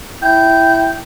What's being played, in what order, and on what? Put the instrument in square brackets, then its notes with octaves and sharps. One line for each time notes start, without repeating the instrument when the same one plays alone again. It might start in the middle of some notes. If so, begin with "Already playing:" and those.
[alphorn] E4 [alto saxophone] G5